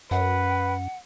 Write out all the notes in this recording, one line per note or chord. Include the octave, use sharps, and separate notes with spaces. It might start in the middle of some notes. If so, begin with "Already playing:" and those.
F#2 B4 F#5